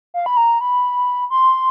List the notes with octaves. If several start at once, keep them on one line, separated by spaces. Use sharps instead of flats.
F5
B5
A#5
B5
C6